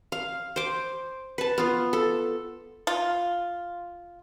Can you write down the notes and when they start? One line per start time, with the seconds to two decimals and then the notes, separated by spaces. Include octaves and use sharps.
0.12 F5
0.56 C5 D6
1.38 B4 A5
1.58 B3 F4
1.93 A4
2.87 F4